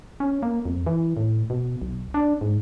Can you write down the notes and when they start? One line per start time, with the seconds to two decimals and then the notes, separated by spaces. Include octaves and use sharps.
0.20 C#4
0.43 A#3
0.65 F2
0.86 E3
1.17 A2
1.50 B2
1.82 B1
2.14 D4
2.41 G#2